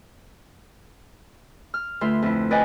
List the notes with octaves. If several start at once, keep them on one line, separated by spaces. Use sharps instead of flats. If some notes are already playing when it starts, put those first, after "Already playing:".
F6
D2 F4 B4 E5 C6
F2 E4
B4 D5 D#5 G5 G#5